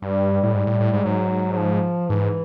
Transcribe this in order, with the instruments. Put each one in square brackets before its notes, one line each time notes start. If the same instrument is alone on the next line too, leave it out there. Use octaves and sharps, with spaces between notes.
[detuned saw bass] G2 [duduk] G3
[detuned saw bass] A2
[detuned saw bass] G#2 [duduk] G3
[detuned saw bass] A2
A2
G#2
[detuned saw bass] G#2 [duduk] F#3
[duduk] F#3
F3
[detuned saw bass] G#2 [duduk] E3